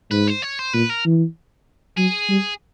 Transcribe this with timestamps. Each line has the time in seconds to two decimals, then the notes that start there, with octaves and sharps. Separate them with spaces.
0.11 G#2 B4
0.27 C5
0.42 C#5
0.59 C5
0.73 A#2 B4
0.90 A#4
1.05 E3
1.97 F#3 G#4
2.29 G3